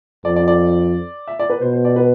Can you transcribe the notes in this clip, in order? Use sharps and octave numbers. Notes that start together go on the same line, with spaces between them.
F2 D5
D5
D5
E5
D5
B4
B2 C5
C5
D5
B4